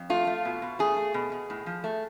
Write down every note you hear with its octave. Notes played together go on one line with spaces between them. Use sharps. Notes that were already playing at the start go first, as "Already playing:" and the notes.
Already playing: F2
A3 F4
A3
B2
B2
A3 G#4
A3
B2
B2
A2
F3
A3